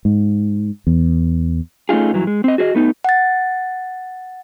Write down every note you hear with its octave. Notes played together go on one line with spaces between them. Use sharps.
G#2
E2
A3 C#4 D#4 F4 G#4
G2 E3 F#3
G#3
C4 D#5
F#4 G#4 C5 D#5
A3 B3 D#4
F#5 A6